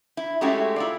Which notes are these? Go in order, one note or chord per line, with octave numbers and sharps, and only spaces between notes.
E4
G#3 A3 C#4 E4 F#4 G4
E4 F4 D5